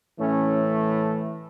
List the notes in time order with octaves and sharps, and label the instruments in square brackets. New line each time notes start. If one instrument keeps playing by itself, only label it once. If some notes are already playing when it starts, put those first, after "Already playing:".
[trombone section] A2 E3 A3 C#4